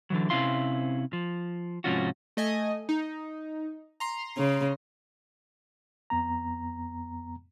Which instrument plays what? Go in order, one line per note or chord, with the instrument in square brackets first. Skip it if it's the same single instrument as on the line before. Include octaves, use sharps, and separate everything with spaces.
[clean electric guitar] D3 E3 F#3
C3 C4 C#4 E4 F5 C6
F3
G#2 C3 F3 C#4 F4 F#4
[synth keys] A3 D#5 G#5
D#4
A#5 C6
[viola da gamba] C#3
[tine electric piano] F2 B3 A#5